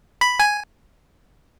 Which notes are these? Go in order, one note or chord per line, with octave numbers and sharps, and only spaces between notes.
B5
G#5